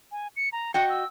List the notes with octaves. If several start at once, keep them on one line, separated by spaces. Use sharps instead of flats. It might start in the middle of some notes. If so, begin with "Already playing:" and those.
G#5
C#7
A#5
F#4 D#5 G5 C#7
E6